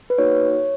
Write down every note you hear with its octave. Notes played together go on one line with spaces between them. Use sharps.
B4
A#3 D#4 F#4 C#5